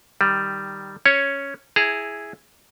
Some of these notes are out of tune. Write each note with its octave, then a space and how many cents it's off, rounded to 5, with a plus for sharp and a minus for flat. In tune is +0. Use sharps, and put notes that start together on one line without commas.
D#3 +0 G3 +0
C#4 +0 C#5 +0
E4 +0 G#4 +0 A#5 -40